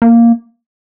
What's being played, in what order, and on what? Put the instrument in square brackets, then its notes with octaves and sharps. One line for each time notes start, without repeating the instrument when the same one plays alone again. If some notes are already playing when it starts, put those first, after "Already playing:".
[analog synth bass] A#3